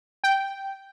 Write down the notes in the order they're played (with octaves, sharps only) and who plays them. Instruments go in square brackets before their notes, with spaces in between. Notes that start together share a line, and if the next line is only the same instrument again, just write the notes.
[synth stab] G5